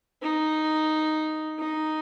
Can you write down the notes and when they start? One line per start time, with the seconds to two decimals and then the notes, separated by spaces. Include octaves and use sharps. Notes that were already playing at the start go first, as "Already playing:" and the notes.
0.22 D#4
1.59 D#4